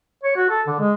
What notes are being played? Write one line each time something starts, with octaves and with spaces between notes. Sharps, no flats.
C#5
F#4
A4
D3
G#3